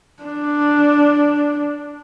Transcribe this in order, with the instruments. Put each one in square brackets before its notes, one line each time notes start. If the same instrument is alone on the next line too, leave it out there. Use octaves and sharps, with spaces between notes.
[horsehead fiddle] D4